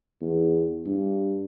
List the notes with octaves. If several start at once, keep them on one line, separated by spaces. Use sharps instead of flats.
E2
G2